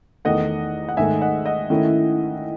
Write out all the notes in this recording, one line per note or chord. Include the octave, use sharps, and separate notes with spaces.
E2 D#3 A3 D#5 F#5
F#5
G#2 D#3 A3 E5 G#5
D#5 F#5
D#5 F#5
D#3 A3 C#4 E4